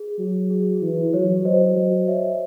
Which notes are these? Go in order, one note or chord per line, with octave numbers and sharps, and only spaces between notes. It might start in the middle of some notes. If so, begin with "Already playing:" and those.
Already playing: G#4
F#3
G#4
E3
F#3 C#5
F#3 C5 D#5
F#3
C#5 E5